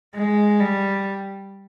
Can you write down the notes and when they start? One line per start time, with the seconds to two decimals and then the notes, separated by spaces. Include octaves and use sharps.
0.15 G#3
0.60 G3